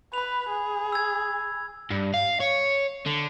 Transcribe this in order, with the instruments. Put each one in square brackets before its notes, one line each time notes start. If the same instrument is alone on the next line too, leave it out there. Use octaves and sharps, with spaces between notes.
[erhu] B4 [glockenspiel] B5 F7
[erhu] G#4
[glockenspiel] E6 G#6
[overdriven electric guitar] G2
F5
C#5
D3